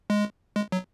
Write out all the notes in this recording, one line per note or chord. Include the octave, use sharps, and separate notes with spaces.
G#3
G#3
F#3